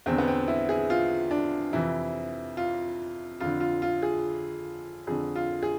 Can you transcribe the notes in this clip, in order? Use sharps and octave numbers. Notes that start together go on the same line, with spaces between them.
E2 D3 C4
B3
C4
E4
G#4
F4
D4
F2 C3 E3 E4
F4
F2 D3 F4
F4
F4
G#4
F2 D3 G#4
F4
G#4